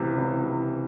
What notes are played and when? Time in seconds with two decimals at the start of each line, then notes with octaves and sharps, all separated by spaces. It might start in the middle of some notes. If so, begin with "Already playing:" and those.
Already playing: C#2 C3 E3
0.18 C#2
0.43 C3 E3